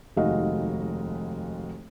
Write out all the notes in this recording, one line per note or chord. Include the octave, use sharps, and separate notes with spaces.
F1 D#2 G#3 F#4 D#5 F5